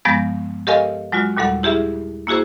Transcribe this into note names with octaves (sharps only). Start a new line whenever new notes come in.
G2 F3 G#3 B3 G6 A#6
G4 A4 A#4 D#5 F5 G#5
F#3 G#3 F4 F#4
D#2 A#2 G3 A4 F#5
E4 G4 G#4 E5
A#3 E4 F#4 G#4 C5